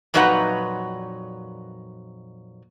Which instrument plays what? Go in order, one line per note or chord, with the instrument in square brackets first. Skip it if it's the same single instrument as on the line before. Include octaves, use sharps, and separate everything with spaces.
[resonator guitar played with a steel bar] F2 A#2 F#3 D#4 B4 F#5